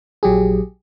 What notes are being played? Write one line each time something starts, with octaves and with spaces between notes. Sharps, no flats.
A#1 F#3 G4 G#4